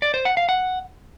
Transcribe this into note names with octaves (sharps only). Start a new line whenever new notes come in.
D5
C5
F#5
F5
F#5